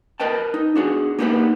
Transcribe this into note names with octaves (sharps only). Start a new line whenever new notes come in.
A#4 B4 D#5 G5 A5
D#4
D4 F#4 G#4
A#3 B3 D#4 G4 G#4 B4